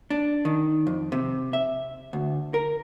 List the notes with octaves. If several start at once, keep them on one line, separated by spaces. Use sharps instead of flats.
D4
D#3
F2
C3
E5
D2
A#4